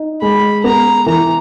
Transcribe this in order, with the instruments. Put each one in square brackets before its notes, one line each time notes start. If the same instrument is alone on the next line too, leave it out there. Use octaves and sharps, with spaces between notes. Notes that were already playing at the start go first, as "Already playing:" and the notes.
Already playing: [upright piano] D#4
[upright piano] G#3 [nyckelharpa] B5
[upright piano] B3 [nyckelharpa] A#5
[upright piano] E3 [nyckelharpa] A#5